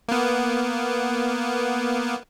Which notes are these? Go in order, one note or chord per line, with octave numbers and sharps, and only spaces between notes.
A#3 B3